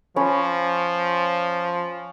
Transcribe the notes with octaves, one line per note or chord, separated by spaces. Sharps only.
F3 C#4 B5